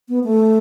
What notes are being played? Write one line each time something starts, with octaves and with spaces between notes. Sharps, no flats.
B3
A3